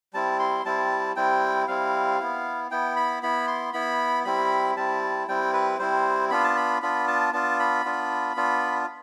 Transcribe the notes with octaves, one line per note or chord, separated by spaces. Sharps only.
G3 C4 E4 A5
C6
G3 C4 E4 A5
G3 C4 E4 G5
G3 C4 E4 F5
B3 E4
B3 E4 G5
B5
B3 E4 B5
C6
B3 E4 B5
G3 C4 E4 B5
G3 C4 E4 A5
G3 C4 E4 G5
B4
G3 C4 E4 C5
B3 D4 F4 B5
A5
B5
B3 D4 F4 B5
A5
B3 D4 F4 A5
B5
B3 D4 F4
B3 D4 F4